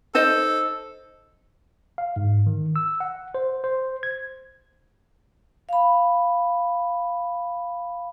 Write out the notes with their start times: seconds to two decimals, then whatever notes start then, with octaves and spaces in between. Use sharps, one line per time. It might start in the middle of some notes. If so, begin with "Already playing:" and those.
0.15 D#4 A4 C5 D#5
1.98 F5
2.16 G#2
2.47 D#3
2.76 E6
3.00 F#5
3.35 C5
3.64 C5
4.03 G#6
5.69 F5 B5